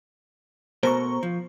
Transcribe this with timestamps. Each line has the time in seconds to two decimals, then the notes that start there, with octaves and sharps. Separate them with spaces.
0.83 B2 A3 A#4 C5 A#5 C#6
1.23 F3